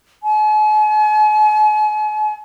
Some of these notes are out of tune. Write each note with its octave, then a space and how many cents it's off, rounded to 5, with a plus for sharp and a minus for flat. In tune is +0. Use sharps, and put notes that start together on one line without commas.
G#5 +45